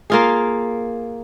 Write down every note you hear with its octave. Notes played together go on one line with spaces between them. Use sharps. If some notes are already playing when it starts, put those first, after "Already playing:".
A#3 F4 G#4